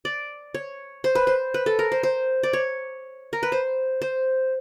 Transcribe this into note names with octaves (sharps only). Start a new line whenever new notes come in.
D5
C#5
C5
B4
C5
B4
A4
A#4
C5
C5
D5
C#5
A#4
B4
C5
C5